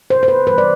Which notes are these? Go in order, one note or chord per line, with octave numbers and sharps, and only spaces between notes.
C3 C5
C5
B4
E3 G3 B4
D5